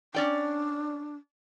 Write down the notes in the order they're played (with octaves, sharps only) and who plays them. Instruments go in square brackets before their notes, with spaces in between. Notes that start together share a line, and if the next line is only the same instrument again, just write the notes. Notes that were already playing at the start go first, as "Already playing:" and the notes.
[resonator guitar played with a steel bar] C#4 D5 G5 [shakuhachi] D4